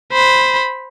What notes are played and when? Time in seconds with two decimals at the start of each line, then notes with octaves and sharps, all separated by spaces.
0.12 C5 B5